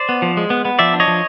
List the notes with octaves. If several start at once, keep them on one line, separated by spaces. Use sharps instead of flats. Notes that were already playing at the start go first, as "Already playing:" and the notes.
Already playing: C5 D5
B3
F3
G#3
B3
B3
F3 D5 E5
D4
C#5 D#5
F3